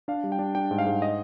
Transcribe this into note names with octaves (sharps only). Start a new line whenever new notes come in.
D4 F5
G3
G5
D4
D4 G5
G#2
F5
G#2
D#5